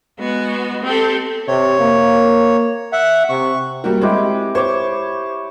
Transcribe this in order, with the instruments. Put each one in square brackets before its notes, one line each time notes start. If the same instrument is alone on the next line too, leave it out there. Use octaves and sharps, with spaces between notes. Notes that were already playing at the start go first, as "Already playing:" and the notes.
[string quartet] G#3 B3 F#4
C4 G4 A4
[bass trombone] C3 [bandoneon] C#5
[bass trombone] A#3
[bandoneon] E5 F#5
[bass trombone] C3 [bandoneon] C#6
[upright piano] G3 A#3 F#4 [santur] G4
[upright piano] G#3 [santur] C4 E4 G4
[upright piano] C5 [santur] C#5 D6